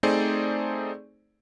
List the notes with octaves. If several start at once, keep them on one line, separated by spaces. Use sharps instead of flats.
A3 C4 D#4 G#4 C5 D5